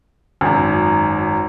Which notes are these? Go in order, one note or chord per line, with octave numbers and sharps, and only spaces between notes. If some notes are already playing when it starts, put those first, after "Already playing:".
G#1 F#2